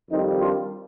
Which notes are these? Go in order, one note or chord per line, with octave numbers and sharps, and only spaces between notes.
F2 D#3 G3 C4 D#4
D4 F4